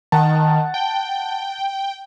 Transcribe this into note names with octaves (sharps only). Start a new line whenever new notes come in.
D#3 F#5 A5
G5